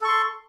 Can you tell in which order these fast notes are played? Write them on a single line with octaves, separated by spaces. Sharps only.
A4 C#6 C6